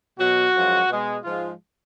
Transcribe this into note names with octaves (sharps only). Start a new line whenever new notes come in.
B2 F#3 F#4
F#2 F3 G#3
B2 G#3
G#2 F3 G#3 F4